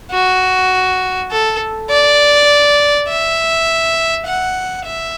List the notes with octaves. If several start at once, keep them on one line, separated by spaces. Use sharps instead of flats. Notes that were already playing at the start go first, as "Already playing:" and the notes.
F#4
A4
D5
E5
F#5
E5